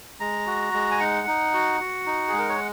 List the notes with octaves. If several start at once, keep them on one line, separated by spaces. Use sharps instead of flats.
G#3 A#5
F#4
G#3
G#5
D#4 F#5
D#4
F#4
F#4
D#4
G#3 G#4
A#4
C#5